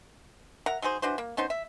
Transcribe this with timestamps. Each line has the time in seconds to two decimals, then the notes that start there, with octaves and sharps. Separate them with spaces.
0.66 A#4 E5 F#5 A#5
0.82 F#3 D#4 G#4 C5
1.02 E3 D4 F#4 C5
1.18 A#3
1.37 B3 C#4 D#4 C5
1.50 E5